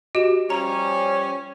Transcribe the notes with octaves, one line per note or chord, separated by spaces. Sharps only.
F#4 G4 D#5
F3 G3 C#4 A#5 F7